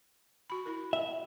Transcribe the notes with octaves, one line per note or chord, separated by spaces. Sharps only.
F#4 B5
E4 A#4
E5